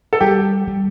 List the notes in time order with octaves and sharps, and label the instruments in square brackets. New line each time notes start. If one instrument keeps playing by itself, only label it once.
[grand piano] A4
[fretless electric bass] G3 [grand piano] G4
[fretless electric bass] G3